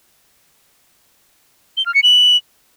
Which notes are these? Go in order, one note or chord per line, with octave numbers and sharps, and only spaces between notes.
G7
F6
C#7
F#7